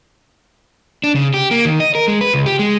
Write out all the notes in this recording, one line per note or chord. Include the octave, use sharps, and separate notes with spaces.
D4
C#3
G4
A#3
D#3
D#5
A#4
G#3
B4
C#2
G4
G#3